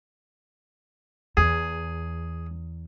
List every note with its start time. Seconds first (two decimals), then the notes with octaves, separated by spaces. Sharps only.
1.37 E2 G#4